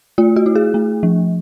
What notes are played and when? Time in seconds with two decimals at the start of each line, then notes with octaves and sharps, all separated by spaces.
0.18 A3 F4
0.36 F#4
0.46 E4
0.55 G#4
0.74 A3
1.03 F3